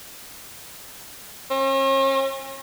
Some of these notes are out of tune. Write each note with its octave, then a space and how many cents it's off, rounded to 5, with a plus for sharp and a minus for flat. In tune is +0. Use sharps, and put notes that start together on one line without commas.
C#4 -45